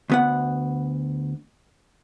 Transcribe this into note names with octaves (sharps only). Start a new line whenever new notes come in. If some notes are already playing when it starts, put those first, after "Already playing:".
D2 B3 F#5